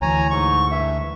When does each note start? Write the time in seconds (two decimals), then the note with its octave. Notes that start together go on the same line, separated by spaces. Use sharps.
0.02 D2 E3 C#5 G#5 A#5
0.30 G#2 C#6
0.71 G2 E5